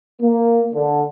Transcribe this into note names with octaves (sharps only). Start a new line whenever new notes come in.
A#3
D3